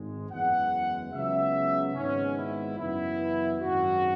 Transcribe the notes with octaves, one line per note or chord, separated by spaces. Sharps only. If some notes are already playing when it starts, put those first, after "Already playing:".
Already playing: G#1 G#2 G#3
F#1 E2 E3 G#3 F#5
C#2 C#3 F#3 B3 E5
G#1 G#2 G#3 B3 C#4
E4
F#2 C#3 E3 B3 E4
G#1 F#2 F#3 F#4